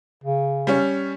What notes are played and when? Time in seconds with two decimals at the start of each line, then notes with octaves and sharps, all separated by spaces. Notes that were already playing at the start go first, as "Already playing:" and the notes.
0.24 C#3
0.67 G3 C#4